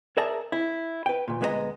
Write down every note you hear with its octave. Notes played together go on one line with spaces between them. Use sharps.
G#4 A#4 D5 E5 A5 A#5
E4
B4 G5
D2 A#2
D2 G#3 B3 B4 D#5 A#5